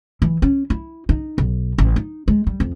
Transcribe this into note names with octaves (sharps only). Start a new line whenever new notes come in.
E3
C#4
E4
D#4
B1
A1
D#4
G#3
G3
F2